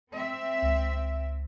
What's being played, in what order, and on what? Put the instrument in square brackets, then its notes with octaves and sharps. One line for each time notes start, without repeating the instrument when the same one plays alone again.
[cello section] C4 E5
[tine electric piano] C#2